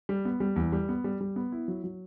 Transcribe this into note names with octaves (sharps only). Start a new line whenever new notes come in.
G3
B3
G3
E2
G3
B3
G3
G3
B3
E4
F#3
F#3